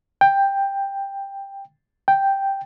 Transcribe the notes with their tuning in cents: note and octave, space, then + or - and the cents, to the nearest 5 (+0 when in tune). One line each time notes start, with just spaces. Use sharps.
G5 +10
G5 +0